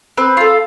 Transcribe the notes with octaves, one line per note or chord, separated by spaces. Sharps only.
C4 B4
F4 A4